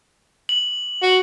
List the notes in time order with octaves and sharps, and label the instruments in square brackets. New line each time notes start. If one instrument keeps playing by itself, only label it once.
[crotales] F#7
[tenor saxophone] F#4